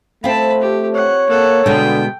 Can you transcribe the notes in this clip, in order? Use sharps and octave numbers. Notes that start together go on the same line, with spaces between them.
A3 C4 F4 A5 B5
G4
C#5 F#5
A#3 A4 F#5
B2 D3 G#3 G5